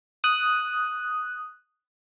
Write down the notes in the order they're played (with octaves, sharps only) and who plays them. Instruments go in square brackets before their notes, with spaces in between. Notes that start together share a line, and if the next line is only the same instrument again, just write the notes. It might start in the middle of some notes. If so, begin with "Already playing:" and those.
[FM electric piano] D#6 F#6